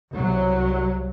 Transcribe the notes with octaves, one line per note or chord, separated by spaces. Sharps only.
C2 F#3